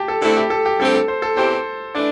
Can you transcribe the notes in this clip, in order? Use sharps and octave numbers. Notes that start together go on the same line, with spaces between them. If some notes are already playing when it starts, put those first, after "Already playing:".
Already playing: G4 A5
A4
D3 A3 C4 E4 A4
G4
A4
G4
G2 D3 A3 C4 G4 A4
A4
C5
A4
E2 E3 C4 G4 C5
E3 A3 D4 D5